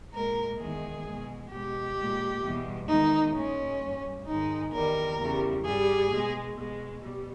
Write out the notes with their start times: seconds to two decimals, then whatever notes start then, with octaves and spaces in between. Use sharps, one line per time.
0.13 A#2 G#3 A#4
0.59 E2 D#3 G#3 G#4
1.05 B2 G#3
1.50 B2 G#3 G4
1.97 A#2 G#3
2.43 E2 B2 G3
2.88 E2 D#3 G#3 D#4
3.35 A#2 G#3 C#4
3.80 G2 G3
4.26 G#2 D#3 G#3 D#4
4.72 E2 D#3 G3 A#4
5.18 E2 C#3 G3
5.64 G2 G3 G#4
6.10 B2 G#3
6.56 B2 G#3
7.02 B2 G3